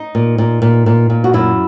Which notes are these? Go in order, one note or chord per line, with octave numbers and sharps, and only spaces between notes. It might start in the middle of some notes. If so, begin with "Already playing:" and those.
Already playing: D#4
A#2
A#2
A#2
A#2
A#2
F#4
F#2 E4